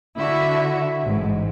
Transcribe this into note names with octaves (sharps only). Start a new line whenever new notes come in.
D3 E4 F#4 E5
A1 G#2